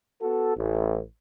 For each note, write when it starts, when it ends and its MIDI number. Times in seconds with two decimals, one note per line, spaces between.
0.21 0.53 59
0.21 0.53 66
0.21 0.53 69
0.57 1.00 33